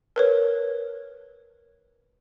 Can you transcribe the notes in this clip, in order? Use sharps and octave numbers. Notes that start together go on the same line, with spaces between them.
A#4 B4 C#5